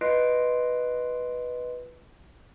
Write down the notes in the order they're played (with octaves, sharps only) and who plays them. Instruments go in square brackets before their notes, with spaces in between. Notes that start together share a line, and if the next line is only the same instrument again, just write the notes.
[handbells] F4 B4 D#5 C7 D7